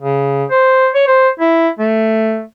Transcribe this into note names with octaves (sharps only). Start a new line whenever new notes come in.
C#3
C5
C#5
C5
E4
A3